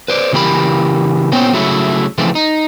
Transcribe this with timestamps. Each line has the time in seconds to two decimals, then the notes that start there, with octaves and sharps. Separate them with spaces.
0.08 B4 C5 D5
0.32 C#3 E3 A#3 G4 B5
1.32 A#2 B3 C#4 C5 C#5 G5
1.53 C#3 F#3 A3 E4
2.18 C#3 E3 F3 A3 C4
2.35 D#4